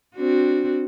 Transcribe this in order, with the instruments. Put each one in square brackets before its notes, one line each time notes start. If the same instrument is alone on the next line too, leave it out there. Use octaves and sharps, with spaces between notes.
[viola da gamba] C4 D4 F#4